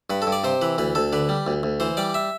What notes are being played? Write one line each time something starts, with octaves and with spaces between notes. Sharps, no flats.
G2 B4
A4
G2
D5
C3 C5
E3 B4
D2 B4
D2 A4
D3 B4
G3
D2
D2
E3 C5
G3 D5
E5